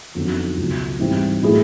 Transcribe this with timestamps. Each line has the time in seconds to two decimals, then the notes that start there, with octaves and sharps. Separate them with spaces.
0.15 F2 D3 F#3 B3 D#4
0.57 C#2 B2 F#3
0.99 G#2 E3 G3 C4
1.42 A2 F#3 B3 E4 G#4